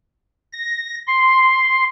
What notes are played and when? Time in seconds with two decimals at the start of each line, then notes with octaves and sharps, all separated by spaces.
0.53 A#6
1.07 C6